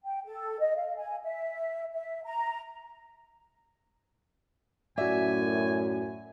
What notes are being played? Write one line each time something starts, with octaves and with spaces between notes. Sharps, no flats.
G5
A4
D#5
F5
G#5
E5
E5
A#5
F#2 A2 F#4 D5 E5 G#5